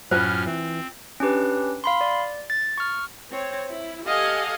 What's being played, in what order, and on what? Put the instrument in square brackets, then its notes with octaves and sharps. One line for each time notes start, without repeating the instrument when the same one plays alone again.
[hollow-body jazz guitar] F#2 [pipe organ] A2 C#4 F6 [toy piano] F4 C5
[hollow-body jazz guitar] E3 [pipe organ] C4
[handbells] C#4 D4 G4 B4
F5 B5 C6
D5
A6
C#6 F6
[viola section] C4 C#5
E4
G4 A4 D#5 F5 F#5 G#5